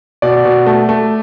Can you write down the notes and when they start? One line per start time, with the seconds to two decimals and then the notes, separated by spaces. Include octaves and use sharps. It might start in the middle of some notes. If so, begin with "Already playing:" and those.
0.22 B2 D5
0.45 B2
0.67 A3
0.89 A3